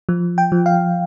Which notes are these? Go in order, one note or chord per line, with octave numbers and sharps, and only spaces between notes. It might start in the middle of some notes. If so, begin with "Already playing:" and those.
F3
G5
F3
F5